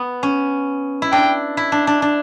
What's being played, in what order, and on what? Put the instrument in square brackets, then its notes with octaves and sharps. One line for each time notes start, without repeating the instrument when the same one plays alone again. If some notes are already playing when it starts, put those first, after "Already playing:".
Already playing: [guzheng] B3
C#4
E4
[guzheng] D4 [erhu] G5
[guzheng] E4
D4
D4
D4